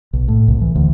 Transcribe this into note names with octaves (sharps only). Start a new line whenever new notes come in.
B1
A2
C2
E3
D2